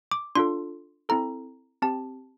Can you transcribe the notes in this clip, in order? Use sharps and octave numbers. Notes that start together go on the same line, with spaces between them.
D6
D4 F4 A4 C6
C4 E4 A4 A#5
C4 G4 A5